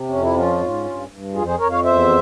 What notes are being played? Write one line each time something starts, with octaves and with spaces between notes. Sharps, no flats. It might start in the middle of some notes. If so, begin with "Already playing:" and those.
Already playing: C3
F2 C#4
E4
F3 C#4 F4
G#2
G2
G2
F2 F4 G#4
G#4 C5
F2 A#4 C#5
C#5 F5
E2 C5 E5